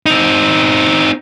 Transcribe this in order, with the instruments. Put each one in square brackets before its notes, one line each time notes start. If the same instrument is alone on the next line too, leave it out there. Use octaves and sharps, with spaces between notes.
[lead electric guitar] C4 D#4